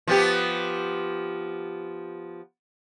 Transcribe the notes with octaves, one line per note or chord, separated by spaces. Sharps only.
F3 B3 G4